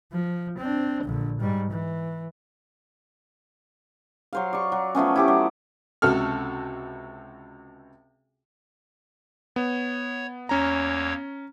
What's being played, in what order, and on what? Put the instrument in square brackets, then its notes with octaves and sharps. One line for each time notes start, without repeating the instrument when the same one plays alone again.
[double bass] F3
C4 D4
A#1 D3
G#2 G3
E3
[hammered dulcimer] F#3 C5 F5
D5 C#6
F#3
F3 A3 B3 C#4
E4 G4 D6
F#3
[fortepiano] C#2 C3 F#4 A4 F6
[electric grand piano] B3 [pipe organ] C#5
[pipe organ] E2 A#3 C#5 [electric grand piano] C#4 A#5